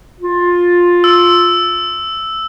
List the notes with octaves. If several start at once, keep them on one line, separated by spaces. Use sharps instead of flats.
F4
E6